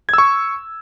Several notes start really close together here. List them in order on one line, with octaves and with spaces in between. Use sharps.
G#6 E6 C#6